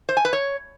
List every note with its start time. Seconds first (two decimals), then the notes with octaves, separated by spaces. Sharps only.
0.09 C5
0.17 G#5
0.25 B4
0.33 C#5